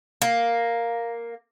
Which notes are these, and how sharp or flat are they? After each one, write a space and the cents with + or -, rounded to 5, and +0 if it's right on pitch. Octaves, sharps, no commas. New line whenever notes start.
A#3 +0